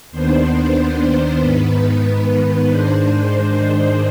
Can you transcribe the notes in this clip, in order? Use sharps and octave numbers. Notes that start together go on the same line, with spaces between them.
D#2 D#3 B3 D4 C5
G#2 D#3 B3 B4
G#2 D#3 G#3 D4 C5